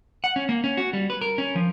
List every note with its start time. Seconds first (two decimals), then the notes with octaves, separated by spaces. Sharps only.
0.24 F#5
0.36 C#4
0.49 A#3
0.64 C#4
0.77 F#4
0.93 G3
1.10 B4
1.21 A#4
1.38 C#4
1.56 F3